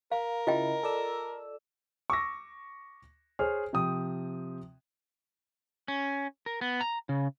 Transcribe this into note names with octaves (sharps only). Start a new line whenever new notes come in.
A#4 F5
C#3 E4 F4 D#5 G5
A4 D5 E6
C#6 D6 E6 A#6
G#4 C5 C#5 F6
C3 F3 G5 D#6
C#4
A#4
B3
A#5
C#3